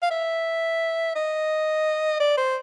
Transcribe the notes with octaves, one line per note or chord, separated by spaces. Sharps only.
F5
E5
D#5
D5
C5